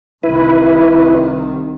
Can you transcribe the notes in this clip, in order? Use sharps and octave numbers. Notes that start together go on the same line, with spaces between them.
C2 C3 D#3 E4 B4